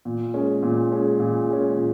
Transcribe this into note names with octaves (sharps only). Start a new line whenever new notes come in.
A#2
G#3 C#4
A#2
G#3 C#4
A#2
G#3 C#4
A#2